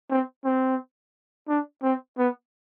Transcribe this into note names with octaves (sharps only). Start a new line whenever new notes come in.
C4
C4
D4
C4
B3